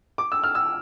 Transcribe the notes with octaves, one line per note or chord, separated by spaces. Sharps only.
D6
E6
F6
E6